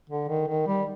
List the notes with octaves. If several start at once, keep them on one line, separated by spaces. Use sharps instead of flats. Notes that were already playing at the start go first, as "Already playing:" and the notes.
D3
D#3
D#3
G3